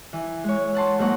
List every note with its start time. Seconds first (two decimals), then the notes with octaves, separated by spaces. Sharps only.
0.13 E3
0.44 G#3 C#5
0.75 F#5 A5 C6
0.99 G#2 F#3 A#3 D#4 F#5 C#6